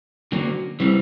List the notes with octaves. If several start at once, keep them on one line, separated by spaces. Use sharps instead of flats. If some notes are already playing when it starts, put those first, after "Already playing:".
D3 F#3 A#3
E3 G3 C4